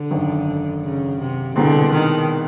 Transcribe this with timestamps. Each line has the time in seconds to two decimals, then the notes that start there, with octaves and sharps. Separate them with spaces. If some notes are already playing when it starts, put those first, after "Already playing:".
Already playing: D3
0.11 G#1 F#2 D#3
0.83 C#3
1.20 C3
1.56 C2 B2 D3 G#3 C4
1.92 D#3